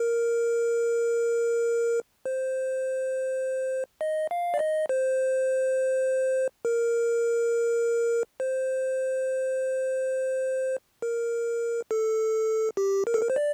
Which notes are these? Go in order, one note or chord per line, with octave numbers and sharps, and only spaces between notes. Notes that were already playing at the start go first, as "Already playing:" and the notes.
Already playing: A#4
C5
D#5
F5
D5
D#5
C5
A#4
C5
A#4
A4
G4
A#4
A4
A#4
C5
D5